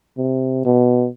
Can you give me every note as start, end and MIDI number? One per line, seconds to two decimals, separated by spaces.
0.17 0.64 48
0.65 1.08 47